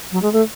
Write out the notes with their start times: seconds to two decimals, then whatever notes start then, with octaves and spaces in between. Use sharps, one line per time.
0.11 F#3
0.22 G#3
0.32 A3